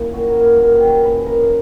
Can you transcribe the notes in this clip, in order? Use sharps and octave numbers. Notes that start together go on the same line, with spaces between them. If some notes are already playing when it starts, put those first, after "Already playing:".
Already playing: F#2 A#3 E4
A#2 F#4
A#4
A#2
B4
A#2 A#4
F#4
G4
F#3
A#4
C#3 B4
C#3 A#4